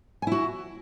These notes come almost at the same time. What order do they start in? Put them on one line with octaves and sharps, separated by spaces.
G#5 E4 F#4